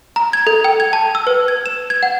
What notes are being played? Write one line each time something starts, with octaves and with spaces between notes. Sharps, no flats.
A#5
G#6
A4
G5
G#6
A5
E6
B4
G#6
E7
G#6
F#5